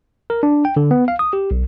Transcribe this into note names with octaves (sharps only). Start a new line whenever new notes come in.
A#4
D4
G5
D3
B3
F5
D#6
G4
B1